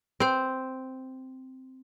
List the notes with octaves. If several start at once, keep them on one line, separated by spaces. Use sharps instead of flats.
C4 C5